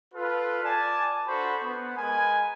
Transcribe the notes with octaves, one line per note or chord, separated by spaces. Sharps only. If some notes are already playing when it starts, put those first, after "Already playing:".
F4 A4 B4
D5 G#5 A5
D4 F#4 A4 C5 B5 C#6
B3
G#3 A#4 B4 G#5